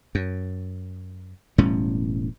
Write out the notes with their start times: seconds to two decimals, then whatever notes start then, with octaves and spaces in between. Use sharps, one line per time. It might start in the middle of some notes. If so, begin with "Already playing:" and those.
0.15 F#2
1.58 E1 A2 G3 C#4